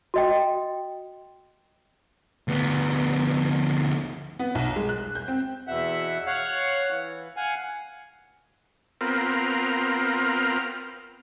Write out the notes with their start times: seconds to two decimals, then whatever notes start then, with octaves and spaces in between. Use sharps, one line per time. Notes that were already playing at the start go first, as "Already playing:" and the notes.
0.14 F#4 D#5 G5
2.48 D2 B3
4.39 B3
4.55 B1
4.76 G#3
4.89 F#6
5.15 G6
5.28 C4
5.68 E2 B2 E5 F#5
6.26 C#5 F5 F#5
6.90 E3
7.37 F5 F#5 G#5
9.01 B3 C4 F4 A#4